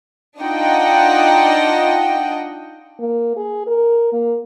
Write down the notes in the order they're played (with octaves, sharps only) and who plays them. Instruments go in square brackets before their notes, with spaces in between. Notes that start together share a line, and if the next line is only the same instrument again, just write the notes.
[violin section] D4 D#4 F4 D#5 F#5 G5
[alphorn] A#3
G#4
A#4
A#3